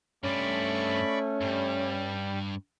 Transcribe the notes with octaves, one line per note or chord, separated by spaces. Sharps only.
G2 A3 C4 C#4 D5 B5 C#6
G2 G3